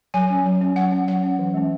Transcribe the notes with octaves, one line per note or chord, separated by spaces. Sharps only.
F#3 G#5
C#4
F#3
C#4
F#3 F#5
C#4
F#3 F#5
C#4
E3
G#3 C#4